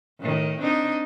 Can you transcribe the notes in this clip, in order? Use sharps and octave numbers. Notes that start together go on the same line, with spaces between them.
A2 D#3
C4 D4 D#4